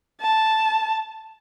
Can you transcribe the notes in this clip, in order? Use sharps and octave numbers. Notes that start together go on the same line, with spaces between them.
A5